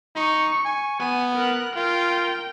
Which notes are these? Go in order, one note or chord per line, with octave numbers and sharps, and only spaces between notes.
D#4 C#6
G#5
B3 G#5
A#4 F#6
F4 A#4 G5